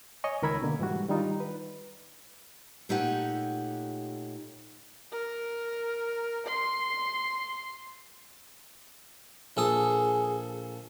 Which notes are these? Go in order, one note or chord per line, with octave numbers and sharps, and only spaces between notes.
C#5 D#5 G#5 C#6
C#2 D#3 A#4 B5 E6 G#6
B2 D3 A#3
G#2 E3 G3 F#4
D#3 G3 D4 D#4 F4
B4
A#2 A3 D#4 G4 C#5 F#5
A#4
C6
A#1 G#4 A4 D#6